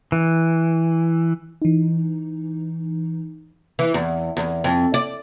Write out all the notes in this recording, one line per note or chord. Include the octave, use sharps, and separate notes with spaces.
E3
E3 D#4
E3
E2
E2
F2
D5